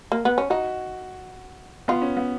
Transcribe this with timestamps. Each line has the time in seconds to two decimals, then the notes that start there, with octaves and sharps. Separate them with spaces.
0.12 A#3
0.25 B3
0.38 C#4
0.50 D#4 F#4
1.88 B3 F4
2.02 C#4
2.17 B3